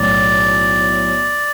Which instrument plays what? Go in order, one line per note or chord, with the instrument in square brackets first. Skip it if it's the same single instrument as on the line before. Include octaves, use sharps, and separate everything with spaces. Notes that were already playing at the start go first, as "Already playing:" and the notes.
Already playing: [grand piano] B1 A2 [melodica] D5